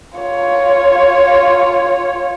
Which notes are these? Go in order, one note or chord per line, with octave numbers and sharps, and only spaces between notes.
F4 C#5